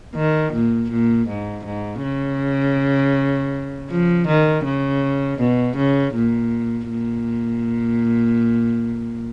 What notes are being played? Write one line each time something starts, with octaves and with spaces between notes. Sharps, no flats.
D#3
A#2
A#2
G#2
G#2
C#3
F3
D#3
C#3
B2
C#3
A#2
A#2